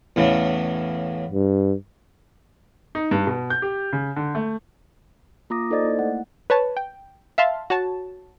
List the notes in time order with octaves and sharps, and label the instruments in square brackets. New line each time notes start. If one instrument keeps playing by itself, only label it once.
[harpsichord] E2 A2 C#3
[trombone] G2
[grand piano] D#4
G2
B2
G6
G4
C#3
D3
A3
[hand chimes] A#3 F4 A#5 D6 D#6 A#6
D#4 A4 C5 D5 D#5 A6
A#3 E4
A3 F#5
[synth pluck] B4 C#5 A5
G5
E5 F5 A5 C6
F#4 C#5 A5